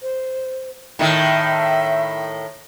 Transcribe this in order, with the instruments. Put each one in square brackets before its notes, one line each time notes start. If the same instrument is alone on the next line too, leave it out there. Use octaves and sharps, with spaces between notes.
[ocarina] C5
[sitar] A2 D#3 [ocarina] E5